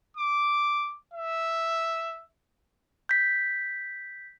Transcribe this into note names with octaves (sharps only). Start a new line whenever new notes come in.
D6
E5
G6 B6